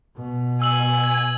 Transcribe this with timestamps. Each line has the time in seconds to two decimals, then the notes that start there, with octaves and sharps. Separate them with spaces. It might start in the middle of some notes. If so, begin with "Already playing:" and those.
0.17 B2
0.62 G#5 E6 F#7
1.04 G#6